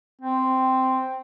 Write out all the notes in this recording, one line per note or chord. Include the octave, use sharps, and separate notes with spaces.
C4